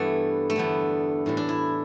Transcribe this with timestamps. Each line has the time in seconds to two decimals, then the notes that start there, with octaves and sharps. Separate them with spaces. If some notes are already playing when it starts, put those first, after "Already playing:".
Already playing: G2 E3 G3 A3 B3
0.50 A3
0.56 E2 D3 G3 B3
1.26 A2 E3 G3
1.37 D4
1.49 E4